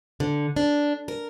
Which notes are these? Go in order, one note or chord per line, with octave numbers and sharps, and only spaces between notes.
D3
D4
A#4